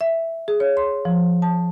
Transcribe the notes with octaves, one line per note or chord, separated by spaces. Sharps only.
E5
G#4
C#5
C6
F3
A5